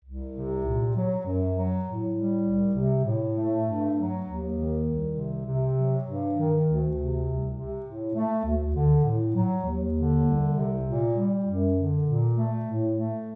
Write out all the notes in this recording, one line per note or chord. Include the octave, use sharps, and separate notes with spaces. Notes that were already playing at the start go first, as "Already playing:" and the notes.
C2
C3
A#2
F#3
F#2
F#3
A2
G3
C2
C3
A2
A3
G2
F#3
D#2
D#3
C2
C3
C3
F#3
G2
D#3
D2
C3
C2
C3
A2
A3
D2
D3
A2
F#3
D#2
D3
C2
C3
A#2
G3
F#2
D3
A#2
A3
A2
A3